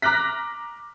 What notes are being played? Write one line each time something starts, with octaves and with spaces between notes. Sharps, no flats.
A#5 D6 F6 F#6 A#6 B6